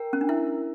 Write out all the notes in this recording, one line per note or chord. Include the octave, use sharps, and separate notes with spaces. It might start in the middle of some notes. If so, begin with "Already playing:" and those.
Already playing: A#4 G5
C#4
D4
E4 E5